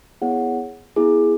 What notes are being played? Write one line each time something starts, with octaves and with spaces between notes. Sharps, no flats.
B3 E4 G#4 C#5 F#5
B3 E4 G#4